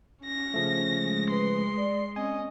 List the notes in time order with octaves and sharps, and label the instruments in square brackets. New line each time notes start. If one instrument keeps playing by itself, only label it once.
[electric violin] C#4 A#6
[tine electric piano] C#3 F3 A3
[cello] G#3
[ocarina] B4 [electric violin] C6
[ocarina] D5
[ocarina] C4 [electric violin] C#4 D#5 [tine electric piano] G#5